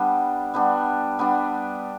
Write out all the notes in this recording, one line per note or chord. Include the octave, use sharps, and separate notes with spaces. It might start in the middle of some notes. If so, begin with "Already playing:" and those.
Already playing: G3 B3 D4
G3 B3 D4
G3 B3 D4